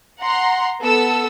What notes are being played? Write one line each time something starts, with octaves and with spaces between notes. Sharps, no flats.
F#5 A#5 C6
B3 A4 E6